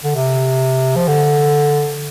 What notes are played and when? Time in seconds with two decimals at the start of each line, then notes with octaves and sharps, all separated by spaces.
0.04 D3
0.15 C3
0.96 F3
1.08 D3